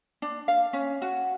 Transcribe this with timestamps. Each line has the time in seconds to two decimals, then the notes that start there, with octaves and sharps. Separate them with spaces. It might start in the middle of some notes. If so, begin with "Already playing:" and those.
0.22 D4
0.48 F5
0.73 C#4
1.02 F#4